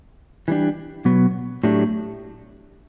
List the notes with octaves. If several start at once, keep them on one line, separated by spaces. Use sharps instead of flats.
E3 G3 D4 G4
B2 F#3 B3
A2 F#3 A3 D4 G4